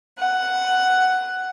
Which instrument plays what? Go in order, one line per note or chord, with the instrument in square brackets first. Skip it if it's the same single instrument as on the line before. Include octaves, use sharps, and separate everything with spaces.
[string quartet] F#5